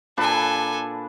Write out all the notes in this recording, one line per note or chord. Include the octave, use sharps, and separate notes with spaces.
A#2 D4 A4 B4 G#5